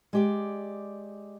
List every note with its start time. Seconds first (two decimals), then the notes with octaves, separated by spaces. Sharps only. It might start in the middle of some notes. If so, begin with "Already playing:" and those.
0.13 G#3 G4 D5